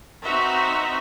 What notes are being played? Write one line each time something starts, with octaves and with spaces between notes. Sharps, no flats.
C4 D#4 F#4 B4 E5 A#5